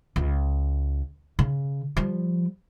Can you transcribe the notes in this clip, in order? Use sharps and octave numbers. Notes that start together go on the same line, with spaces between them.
C#2
C#3
F3 G3